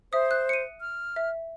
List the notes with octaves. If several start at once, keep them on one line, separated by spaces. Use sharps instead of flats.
C5 E5 D#6
F#6
C#7 D#7
F6
E5